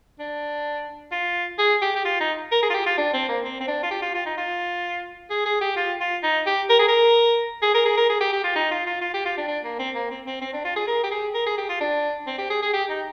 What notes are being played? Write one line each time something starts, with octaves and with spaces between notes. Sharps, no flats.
D4
F4
G#4
G4
G4
F4
D#4
A#4
G#4
F4
G4
F4
D4
C4
A#3
C4
C4
D4
F4
G4
F4
F4
D#4
F4
G#4
G#4
G4
F4
F4
D#4
G4
A#4
G#4
A#4
G#4
A#4
G#4
A#4
G#4
G4
G4
F4
D#4
F4
F4
F4
G4
F4
D4
D4
A#3
C4
A#3
C4
C4
C4
D4
F4
G#4
A#4
G4
G#4
A#4
G#4
G4
F4
D4
C4
G4
G#4
G#4
G4
D#4